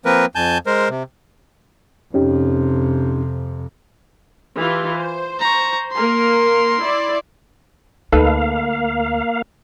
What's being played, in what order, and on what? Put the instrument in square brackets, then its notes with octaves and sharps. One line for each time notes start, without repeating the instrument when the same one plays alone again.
[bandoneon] F3 A#3 C4 A#4 B4
F2 G#5 A5 G6
G#3 A#4 C5
C3
[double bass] F2 C3 [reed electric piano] C#4 D#4 G4
[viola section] E3 F4 G4
C5
[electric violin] A#5 C#6
[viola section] A#3 A#4 [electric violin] C6
[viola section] E4 D5
[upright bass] D2 [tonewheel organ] A#3 F5 [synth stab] D#4 A4 B4